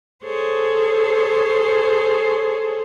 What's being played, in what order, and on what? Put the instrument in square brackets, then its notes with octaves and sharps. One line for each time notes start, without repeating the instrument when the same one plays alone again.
[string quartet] G#4 A4 C5 C#5